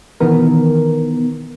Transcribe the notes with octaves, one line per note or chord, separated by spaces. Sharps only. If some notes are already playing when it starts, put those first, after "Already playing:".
B2 D#3 E3 B3 A#4